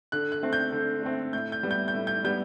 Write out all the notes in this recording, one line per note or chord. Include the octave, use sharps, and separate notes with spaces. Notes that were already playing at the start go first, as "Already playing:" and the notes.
D3 F#6
F#6
A3 C4
G6
D3
A3 C4
A2 G6
G6
G3 B3
G6
G6
A2
G6
G3 B3 G6